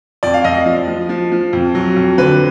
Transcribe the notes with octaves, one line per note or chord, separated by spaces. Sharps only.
F2 D5
F5
F2 D#5
F3
F3
F3
F3
F2
F#3
F2
D3 B4